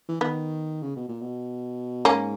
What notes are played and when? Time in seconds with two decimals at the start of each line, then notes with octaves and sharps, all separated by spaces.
0.09 E3
0.21 D#3 B3
0.83 C#3
0.96 B2
1.08 A#2
1.21 B2
2.05 G#2 A#3 C#4